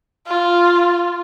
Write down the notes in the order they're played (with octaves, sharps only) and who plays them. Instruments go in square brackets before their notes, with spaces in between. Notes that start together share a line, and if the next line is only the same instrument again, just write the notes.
[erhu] F4